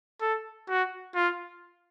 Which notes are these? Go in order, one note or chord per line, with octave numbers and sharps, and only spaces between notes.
A4
F#4
F4